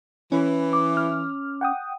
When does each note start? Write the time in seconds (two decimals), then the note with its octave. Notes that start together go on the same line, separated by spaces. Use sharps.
0.32 E3 C#4
0.73 D6
0.97 F6
1.61 F#5 G5 D#6